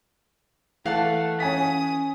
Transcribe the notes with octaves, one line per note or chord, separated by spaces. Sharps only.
E3 A3 F5 F#5 A5
C#4 G#5 D#6 B6